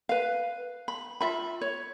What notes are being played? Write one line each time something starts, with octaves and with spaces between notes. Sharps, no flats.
B4 F5
B5
F4 E5 B5
C#5